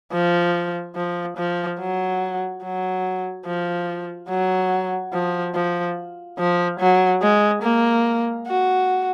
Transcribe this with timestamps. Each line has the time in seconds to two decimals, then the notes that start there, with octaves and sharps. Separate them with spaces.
0.13 F3
0.96 F3
1.37 F3
1.79 F#3
2.63 F#3
3.46 F3
4.29 F#3
5.13 F3
5.54 F3
6.38 F3
6.80 F#3
7.22 G#3
7.62 A#3
8.47 F#4